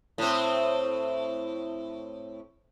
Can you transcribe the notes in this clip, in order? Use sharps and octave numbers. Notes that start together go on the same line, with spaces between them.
A2 C4